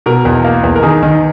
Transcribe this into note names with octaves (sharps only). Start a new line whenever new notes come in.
B2 A#4
E2
A#3
E2
A#4
D#3 G#4
D#3